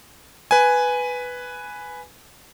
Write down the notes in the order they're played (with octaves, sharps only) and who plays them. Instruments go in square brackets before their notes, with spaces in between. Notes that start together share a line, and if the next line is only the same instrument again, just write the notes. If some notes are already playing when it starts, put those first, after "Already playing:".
[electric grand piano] B4 G#5